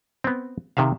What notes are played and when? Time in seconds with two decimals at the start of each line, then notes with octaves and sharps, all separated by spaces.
0.24 B3 C4
0.77 C3 D#3 E5 F5